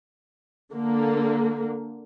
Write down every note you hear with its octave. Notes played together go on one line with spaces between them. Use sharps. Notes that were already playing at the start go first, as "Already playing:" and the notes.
D3 A#3